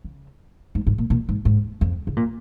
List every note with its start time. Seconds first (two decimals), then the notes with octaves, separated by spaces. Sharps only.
0.04 C#3
0.75 G#2
0.87 G#2
0.98 A#2
1.10 A#2
1.29 G#2
1.45 G#2
1.81 F2
2.07 C#3
2.17 A#2